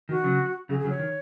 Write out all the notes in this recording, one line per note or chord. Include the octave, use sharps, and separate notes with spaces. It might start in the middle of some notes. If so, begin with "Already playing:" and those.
D#3 F#4
C#3 F#3
C#3 F#3 G#4
G#4
C#3 F#3
C#5
D#3